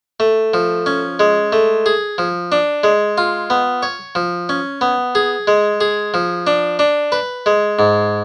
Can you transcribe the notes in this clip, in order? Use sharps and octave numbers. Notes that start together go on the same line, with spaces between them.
A3
F3
C#4
G#3
A3
G#4
F3
D4
G#3
F4
B3
C#5
F3
C#4
B3
G#4
G#3
G#4
F3
D4
D4
B4
G#3
G#2